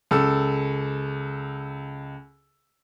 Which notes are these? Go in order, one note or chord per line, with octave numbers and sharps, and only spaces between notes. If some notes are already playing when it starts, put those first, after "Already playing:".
C#2 A4 E6